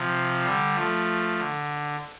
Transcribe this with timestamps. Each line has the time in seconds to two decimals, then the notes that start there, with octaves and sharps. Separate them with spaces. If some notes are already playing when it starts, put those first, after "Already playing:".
Already playing: C3 F3
0.43 D3 G3
0.75 F3 A3
1.38 D3